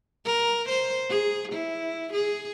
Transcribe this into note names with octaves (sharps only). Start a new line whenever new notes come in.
A#4
C5
G#4
E4
G#4